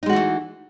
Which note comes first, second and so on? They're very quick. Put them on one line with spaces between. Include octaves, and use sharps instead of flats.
D#4 G#3 F#4 E3 A3